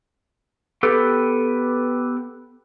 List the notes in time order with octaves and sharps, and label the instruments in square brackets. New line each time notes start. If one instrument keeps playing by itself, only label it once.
[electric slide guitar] B3 G4 A4 B4